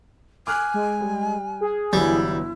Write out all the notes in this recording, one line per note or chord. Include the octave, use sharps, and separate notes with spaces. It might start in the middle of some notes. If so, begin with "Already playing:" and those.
G#5 D6 F6 F#6
G#3
G3
G#4
G1 E3 F#3 G3 E4